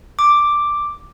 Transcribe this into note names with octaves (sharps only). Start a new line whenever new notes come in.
D6